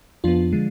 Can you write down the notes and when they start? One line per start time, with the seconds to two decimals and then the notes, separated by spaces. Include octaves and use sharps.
0.24 F2 F3 B3 D4 F4
0.52 D3 F3 G#3